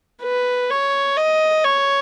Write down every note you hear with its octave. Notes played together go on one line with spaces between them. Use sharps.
B4
C#5
D#5
C#5